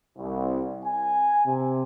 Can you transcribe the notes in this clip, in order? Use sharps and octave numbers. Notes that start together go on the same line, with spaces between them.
C2
G#5
C3